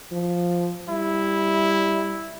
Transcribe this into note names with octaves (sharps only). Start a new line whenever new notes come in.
F3
G3 E4